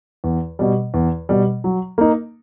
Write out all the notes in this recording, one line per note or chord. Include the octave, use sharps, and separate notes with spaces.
E2
B2 G3
E2
B2 G3
F#3
A#3 D#4